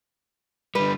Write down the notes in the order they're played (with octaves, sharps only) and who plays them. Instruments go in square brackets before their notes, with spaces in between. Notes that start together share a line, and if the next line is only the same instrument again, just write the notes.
[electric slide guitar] D3 G3 [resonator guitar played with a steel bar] B4